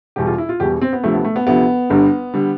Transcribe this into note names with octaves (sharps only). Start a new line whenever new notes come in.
E1 E2 B2 G3 G4
F4
E4
F4
E1 E2 B2 G3 G4
C4
B3
D2 C3 F3 A3
B3
A3
B3
D2 C3 F3 B3
G1 G2 D3 G3
D3 G3